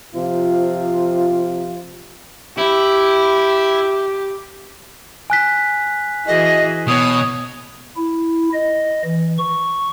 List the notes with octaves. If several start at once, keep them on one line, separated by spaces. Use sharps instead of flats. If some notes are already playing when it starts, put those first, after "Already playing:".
C3 F3 F4
E4 G4
G#5 F#6 B6
E3 F#4 G#4 D#5
B2 C#5 D#6
E4
D#5
E3
C#6